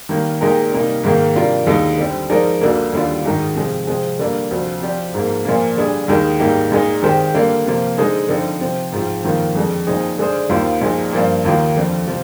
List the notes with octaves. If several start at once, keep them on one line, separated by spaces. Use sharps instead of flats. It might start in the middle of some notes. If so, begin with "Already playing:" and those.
D#3 G3 A#3
A#2 G#3 D#4 G4 A#4
C3 G3 A#3 D#4
G#2 D#3 A#3
C3 G3 D4 F4 A#4
D#2 D3 G#3 D#4
D3 G3 C4
F3 G#3 D#4 A#4 D5
D2 D3 G3 A#3
D#2 D3 G3 D4 F4
G#2 D#3 G#3 D#4
C3 F3 G#3
C3 F3 G#3 C4
D3 G3 A#3 D4
D2 C3 F3
F3 C4 G4 D5
G#2 F3 A#3
A#2 F3 A#3
D3 G3 D4 G#4 D5
D#2 D#3 G#3
G#2 G3 A#3 D#4 G4
A#2 G#3 D#4
D#3 G#3 C4 G4 C5
D3 G3 A#3
C3 F3 A#3
D3 G#3 D#4 G#4 C5
D3 F3 C4 D#4
C3 F3 C4
G#2 F3 C4 F4
F2 D#3 A#3 F4 C5
F2 D3 G#3
A#2 F3 C4 D#4 G#4
D3 G#3 D4 G#4 C5
D#2 D#3 A#3 F4 C5
A#2 F3 G#3 D#4
G2 F3 A#3
D#2 D#3 A#3 F4
F2 D3 F3
C3 F3